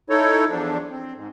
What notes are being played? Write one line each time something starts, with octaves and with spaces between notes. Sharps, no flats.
D#4 E4 A4 C#5
E2 F3 D4
C4
G#2